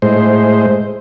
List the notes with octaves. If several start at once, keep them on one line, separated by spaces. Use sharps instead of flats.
A2 G#3 C5